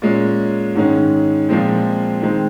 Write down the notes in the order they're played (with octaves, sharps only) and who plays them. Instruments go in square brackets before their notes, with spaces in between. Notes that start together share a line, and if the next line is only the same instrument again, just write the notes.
[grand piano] A#2 G#3 C#4
G#2 D#3 G#3 C#4
A#2 F3 G#3 C4
D#3 G#3 C4